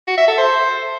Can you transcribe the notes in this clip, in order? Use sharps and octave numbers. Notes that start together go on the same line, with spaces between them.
F#4
E5
A4
C5